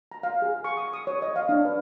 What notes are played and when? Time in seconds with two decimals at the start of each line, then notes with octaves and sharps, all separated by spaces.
0.12 A#5
0.23 F5
0.42 G#4
0.64 C#6
0.77 D#6
0.93 D#6
1.07 C#5
1.22 D#5
1.36 F5
1.49 D4
1.65 B4